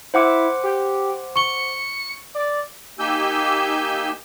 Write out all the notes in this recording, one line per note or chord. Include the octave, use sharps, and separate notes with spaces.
E4 C5 F#5 D6
G4
C#6 C#7 G7
D5
A#3 D#4 G4 G#5 E6 G6